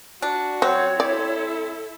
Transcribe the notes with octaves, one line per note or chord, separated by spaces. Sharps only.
D4 F#4
F#3 C4 C#5
E4 A4 D5